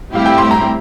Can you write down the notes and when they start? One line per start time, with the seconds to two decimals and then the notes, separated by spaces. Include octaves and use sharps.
0.13 A2 G3 C4 E4 G4 F5
0.26 G5
0.38 C6
0.51 A#5